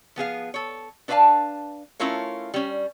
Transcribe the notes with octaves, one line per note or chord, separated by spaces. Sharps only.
F3 B3 G#4 F5
A4 C#5
D4 B4 C5 E5 F5 A5
A3 C#4 E4 F4 A#4 C#5
G3 C#4